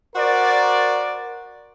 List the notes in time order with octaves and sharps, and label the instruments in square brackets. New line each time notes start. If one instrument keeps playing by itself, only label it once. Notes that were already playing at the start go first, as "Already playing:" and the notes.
[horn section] F#4 A#4 C5 D5